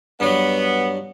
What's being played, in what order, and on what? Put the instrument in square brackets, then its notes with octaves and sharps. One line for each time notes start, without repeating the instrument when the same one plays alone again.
[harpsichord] G2 F#3 [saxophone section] B3